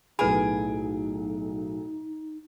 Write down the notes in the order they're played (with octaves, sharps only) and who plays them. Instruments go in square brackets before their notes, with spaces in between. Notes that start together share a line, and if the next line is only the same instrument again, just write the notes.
[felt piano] B1 A2 D7 [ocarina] D#4 [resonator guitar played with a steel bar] G#4 [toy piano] B4 B5